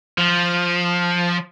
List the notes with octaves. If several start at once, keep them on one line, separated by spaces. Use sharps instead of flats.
F3